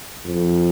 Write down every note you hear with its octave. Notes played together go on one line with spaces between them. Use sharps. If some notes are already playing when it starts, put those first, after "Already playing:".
F2